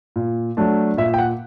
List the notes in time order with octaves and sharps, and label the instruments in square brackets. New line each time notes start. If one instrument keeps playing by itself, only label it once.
[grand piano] A#2
F#3 A3 D4
A#2 E5
G5
F#5